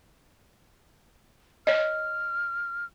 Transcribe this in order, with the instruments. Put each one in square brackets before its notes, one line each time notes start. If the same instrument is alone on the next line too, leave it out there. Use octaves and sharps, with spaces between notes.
[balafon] C#5 D#5 [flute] F6